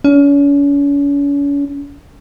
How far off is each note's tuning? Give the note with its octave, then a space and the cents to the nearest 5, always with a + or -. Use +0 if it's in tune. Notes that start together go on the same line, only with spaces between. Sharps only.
C#4 +40